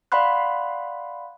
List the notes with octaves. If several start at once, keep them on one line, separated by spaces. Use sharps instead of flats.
D5 F5 F#5 B5 C6 F#6